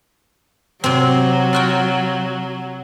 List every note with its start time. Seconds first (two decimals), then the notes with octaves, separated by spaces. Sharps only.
0.84 C3 F#3 C4
1.53 F4 F#4 G5